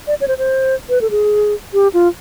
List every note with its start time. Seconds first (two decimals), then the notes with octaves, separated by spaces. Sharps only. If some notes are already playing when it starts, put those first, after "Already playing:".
0.07 D5
0.21 C#5
0.28 C5
0.38 C5
0.89 B4
1.01 A4
1.11 G#4
1.73 G4
1.94 F4